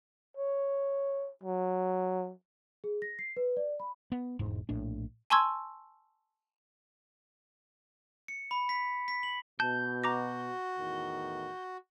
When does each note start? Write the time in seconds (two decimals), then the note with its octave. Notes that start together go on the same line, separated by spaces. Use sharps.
0.37 C#5
1.43 F#3
2.84 G#4
3.02 A#6
3.19 C7
3.37 B4
3.57 D5
3.80 B5
4.12 B3
4.39 E1 G#2
4.69 A#1 A2 D4
5.30 G#5 A5 C6 C#6 E6 G#6
8.28 C#7
8.51 B5
8.69 B6
9.08 B6
9.23 F#7
9.60 B2 A5 G6
10.04 F#4 A#5 D6 A#6
10.78 E2 A2 D#3